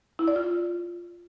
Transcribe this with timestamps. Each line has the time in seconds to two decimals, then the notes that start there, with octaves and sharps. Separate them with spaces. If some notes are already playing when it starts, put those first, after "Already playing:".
0.19 E4
0.28 D5
0.36 F4